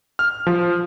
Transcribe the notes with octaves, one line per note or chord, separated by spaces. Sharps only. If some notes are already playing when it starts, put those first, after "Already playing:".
F6
F3